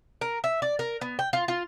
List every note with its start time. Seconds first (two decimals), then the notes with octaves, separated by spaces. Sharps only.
0.21 A#4
0.44 E5
0.62 D5
0.79 A#4
1.01 B3
1.19 G5
1.33 F4
1.48 F4